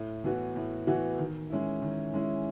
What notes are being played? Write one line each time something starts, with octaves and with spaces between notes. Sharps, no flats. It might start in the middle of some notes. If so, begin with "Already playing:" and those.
Already playing: A2
E3 B3 F#4
A2
E3 B3 F#4
D#3
G#3 C#4 E4
D#3
G#3 C#4 E4